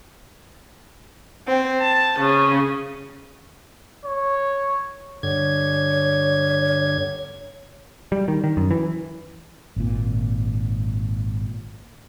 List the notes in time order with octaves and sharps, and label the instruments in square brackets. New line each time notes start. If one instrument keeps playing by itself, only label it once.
[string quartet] C4
A5
C#3
[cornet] C#5
[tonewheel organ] G2 D3 G#6 [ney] C#5
[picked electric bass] G3
D#3
D#3
F#2
E3
[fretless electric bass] G#1 A#2